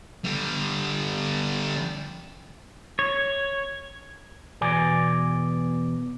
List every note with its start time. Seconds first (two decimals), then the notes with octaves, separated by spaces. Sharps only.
0.24 D3 G3
2.99 C#5
4.61 E2 B2 D5 G#5